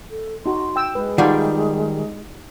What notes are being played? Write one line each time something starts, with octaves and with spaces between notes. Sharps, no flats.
A4
D#4 F#4 C6
G5 E6
G#3 B4
D#3 G3 D#4 F4 G4 D5 F#5